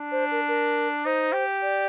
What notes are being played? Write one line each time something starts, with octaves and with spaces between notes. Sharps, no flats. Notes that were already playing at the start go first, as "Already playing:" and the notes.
Already playing: D4
C5
A#4
A#4
D#4 C5
G4
D5